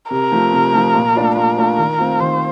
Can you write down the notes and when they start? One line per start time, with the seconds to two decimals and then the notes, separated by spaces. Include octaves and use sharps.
0.11 C3 A#4
0.32 F3 A3
0.53 C3
0.73 F3 A3
0.95 A#2
1.15 A3 D4 F4
1.36 A#2 A#4
1.57 A3 D4 F4
1.78 D#3
1.98 A3 C4 F4
2.20 D#3 C5